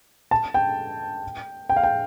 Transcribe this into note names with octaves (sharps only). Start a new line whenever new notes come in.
A5
G5
G5
F5
G5